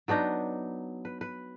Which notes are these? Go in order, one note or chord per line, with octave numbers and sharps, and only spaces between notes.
F#3 B3 D4 D#4
B4
B4